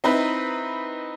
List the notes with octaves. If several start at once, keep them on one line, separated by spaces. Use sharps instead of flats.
C4 D#4 E4 B4